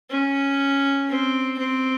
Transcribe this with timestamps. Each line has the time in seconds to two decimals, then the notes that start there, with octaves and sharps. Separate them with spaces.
0.10 C#4
1.09 C4
1.58 C4